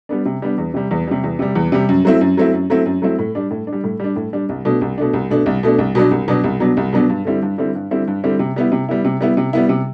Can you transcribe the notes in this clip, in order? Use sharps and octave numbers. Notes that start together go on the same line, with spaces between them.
G3 B3 D4
C3
G3 B3 D4
E2
C3 G3
E2
C3 G3
E2
C3 G3
E2
C3 G3
F#2
F#3 A3 C4 E4
F#2
F#3 A3 C4 E4
F#2
F#3 A3 C4 E4
F#2
F#3 A3 C4 E4
A2
G3 D4
A2
D4
G3
A2
G3 D4
A2
G3 D4
C2
B2 A3 D4
C2
B2 A3 D4
C2
B2 A3 D4
C2
B2 A3 D4
C2
B2 F#3 B3 D4
C2
B2 F#3 B3 D4
C2
B2 F#3 B3 D4
C2
B2 F#3 B3 D4
G2
D3 G3 C4 E4
G2
D3 G3 C4 E4
G2
D3 G3 C4 E4
G2
D3 G3 C4 E4
C3
G3 B3 E4
C3
G3 B3 E4
C3
G3 B3 E4
C3
G3 B3 E4
C3